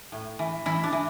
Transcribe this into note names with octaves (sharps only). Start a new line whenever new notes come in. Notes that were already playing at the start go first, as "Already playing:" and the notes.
A2
E3
E3 E4
D4
E3